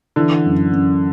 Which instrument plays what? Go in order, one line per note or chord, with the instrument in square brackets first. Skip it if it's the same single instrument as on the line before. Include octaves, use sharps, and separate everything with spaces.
[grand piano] D3 [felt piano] E3
[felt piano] F#2
F#2